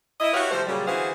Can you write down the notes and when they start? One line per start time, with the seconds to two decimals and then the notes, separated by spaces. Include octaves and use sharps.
0.20 E4 D#5
0.34 E4 F#4 G4 B4 C#5 F5
0.51 C3 F3 G3 A3 C5
0.67 A#2 C#3 F#3 G3
0.87 D3 E3 F#4 G#4 C5 F5